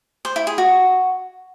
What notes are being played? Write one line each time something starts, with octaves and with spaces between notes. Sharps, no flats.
C5
E4
G#4
F#4